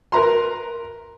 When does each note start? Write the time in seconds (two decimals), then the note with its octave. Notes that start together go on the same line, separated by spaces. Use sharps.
0.12 A#4 B4 A#5 C6